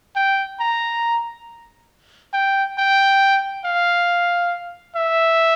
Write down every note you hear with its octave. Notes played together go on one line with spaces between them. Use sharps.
G5
A#5
G5
G5
F5
E5